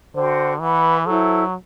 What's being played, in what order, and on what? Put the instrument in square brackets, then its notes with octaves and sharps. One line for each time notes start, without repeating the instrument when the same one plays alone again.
[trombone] D3 [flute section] F#4 C5 G5
[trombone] E3 [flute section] B4 F#5 B5
[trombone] F#3 [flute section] E4 A4 C5